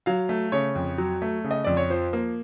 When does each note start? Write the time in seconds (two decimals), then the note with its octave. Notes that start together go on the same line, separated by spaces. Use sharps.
0.06 F#3 F5
0.29 A3
0.52 C#3 C#5
0.75 F2
0.98 F#3
1.22 A3
1.44 C#3
1.51 D#5
1.64 F2 D5
1.77 C#5
1.90 F3 C5
2.13 A#3